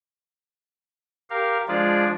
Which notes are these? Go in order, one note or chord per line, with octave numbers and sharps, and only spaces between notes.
G4 A#4 F5
F3 G#3 D4 F4 G#4 D5